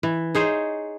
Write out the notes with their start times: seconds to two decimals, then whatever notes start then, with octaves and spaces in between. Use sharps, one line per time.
0.03 E3
0.35 D#4 G#4 C5 C#5